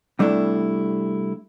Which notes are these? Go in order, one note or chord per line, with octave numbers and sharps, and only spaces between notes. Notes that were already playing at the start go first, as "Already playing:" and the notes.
C3 G3 A3 D4 E4 A4